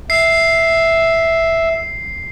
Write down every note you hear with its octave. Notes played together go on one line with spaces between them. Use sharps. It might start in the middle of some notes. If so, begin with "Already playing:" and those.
E5 C7